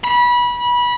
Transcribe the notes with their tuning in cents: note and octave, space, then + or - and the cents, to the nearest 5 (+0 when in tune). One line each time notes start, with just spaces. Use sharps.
B5 -25